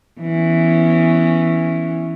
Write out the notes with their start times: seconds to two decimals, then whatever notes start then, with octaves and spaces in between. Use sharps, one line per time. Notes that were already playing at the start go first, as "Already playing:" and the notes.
0.21 E3 B3 C#4